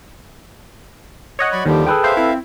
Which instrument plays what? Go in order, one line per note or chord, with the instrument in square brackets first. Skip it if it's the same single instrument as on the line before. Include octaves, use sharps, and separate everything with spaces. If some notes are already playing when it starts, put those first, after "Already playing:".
[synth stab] C#5 D#5 F#5
[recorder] F#3 [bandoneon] D5 B5 C#6
[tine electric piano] D#2 [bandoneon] D3 F3 G3 [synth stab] D#3 [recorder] G4
[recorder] G#4 [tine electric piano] A4 B4 G5
[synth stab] C5 [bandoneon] E5 F5
[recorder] C4 [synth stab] E4